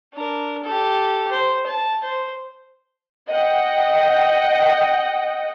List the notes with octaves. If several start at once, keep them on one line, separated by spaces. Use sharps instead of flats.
D4 A#4
G4 A4
C5
A5
C5
D#5 F#5 G5